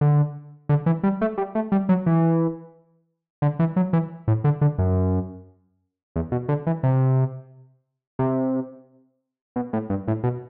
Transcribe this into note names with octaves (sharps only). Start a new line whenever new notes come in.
D3
D3
E3
G3
A3
G3
A3
G3
F#3
E3
D3
E3
F#3
E3
A2
D3
D3
F#2
E2
B2
D3
E3
C3
C3
B2
A2
G2
A2
B2